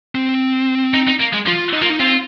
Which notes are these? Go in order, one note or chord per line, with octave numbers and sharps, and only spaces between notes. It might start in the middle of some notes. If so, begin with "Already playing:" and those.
C4
D#4
D#4
A#3
G#3
F3 F4
D#4
A#3 F4
D#4
C4 F4